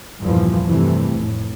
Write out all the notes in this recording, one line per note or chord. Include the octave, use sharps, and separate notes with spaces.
E2 G2 A#2 E3 F3
G2 C3 E3 A3
F1 A2